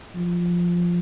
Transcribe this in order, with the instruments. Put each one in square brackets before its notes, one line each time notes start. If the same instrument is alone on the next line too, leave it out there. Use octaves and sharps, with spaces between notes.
[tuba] F3